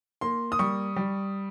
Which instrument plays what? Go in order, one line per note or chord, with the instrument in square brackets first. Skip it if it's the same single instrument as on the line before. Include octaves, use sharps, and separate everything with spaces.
[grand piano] A#3 C6
D#6
G3 C#6
G3